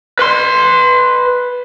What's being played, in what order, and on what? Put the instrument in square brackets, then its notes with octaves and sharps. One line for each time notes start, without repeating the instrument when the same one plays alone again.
[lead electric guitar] B4 C6